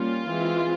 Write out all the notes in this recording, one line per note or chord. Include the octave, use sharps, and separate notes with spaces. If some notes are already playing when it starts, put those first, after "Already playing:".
Already playing: G3 A#3 C#4 F4
E3 G#3 C4